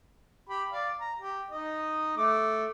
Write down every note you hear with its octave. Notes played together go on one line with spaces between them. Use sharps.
G4 B5
D5 F5
A#5
G4
D#4 D#5
A3 D6